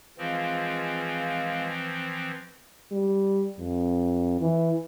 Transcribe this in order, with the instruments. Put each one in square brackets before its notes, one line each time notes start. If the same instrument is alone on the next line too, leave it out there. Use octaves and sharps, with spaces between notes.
[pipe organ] E3 F3 C4 [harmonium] G#3 F4
[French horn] G3
F2
E3